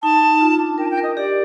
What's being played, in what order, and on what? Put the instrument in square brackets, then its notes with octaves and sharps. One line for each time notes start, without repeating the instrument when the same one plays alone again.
[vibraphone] D#4 [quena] A5
[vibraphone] D#4
F4
D4
[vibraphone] A#4 [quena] G5
[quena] A5
G5
[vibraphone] A#4
[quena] D#5
[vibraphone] G4 [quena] D5